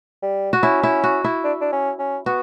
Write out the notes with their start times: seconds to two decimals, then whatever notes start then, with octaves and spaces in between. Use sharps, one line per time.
0.22 G3
0.53 F#4
0.63 C#4 E4
0.83 E4
1.04 F#4
1.24 E4
1.44 D4
1.61 D4
1.72 C#4
1.99 C#4
2.26 B3 F#4